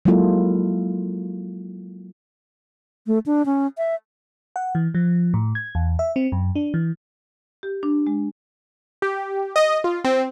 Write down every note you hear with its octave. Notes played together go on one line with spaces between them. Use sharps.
F#3 G#3 A#3 E4 F4 A4
A3
D4
C#4
E5
F#5
E3
F3
A2
G#6
E2
E5
C4
F#2
D4
E3
G4
D4
G#3
G4
D#5
F4
C4